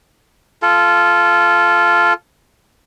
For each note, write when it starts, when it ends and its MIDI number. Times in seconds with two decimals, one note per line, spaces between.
0.62 2.13 65
0.62 2.13 69